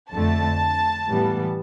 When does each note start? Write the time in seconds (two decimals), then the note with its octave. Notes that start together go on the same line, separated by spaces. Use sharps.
0.11 F2 D3 A3 A5
1.07 A2 E3 G3 B3